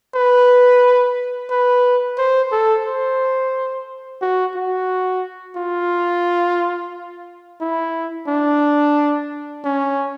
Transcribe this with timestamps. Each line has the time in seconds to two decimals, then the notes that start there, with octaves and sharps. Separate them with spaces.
0.15 B4
1.50 B4
2.18 C5
2.52 A4
2.86 C5
4.22 F#4
4.55 F#4
5.57 F4
7.61 E4
8.28 D4
9.64 C#4